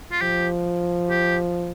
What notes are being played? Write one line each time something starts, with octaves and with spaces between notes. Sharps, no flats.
F4
F3 G4
G4